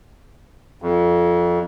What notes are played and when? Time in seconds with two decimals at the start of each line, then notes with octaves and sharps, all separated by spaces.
0.82 F2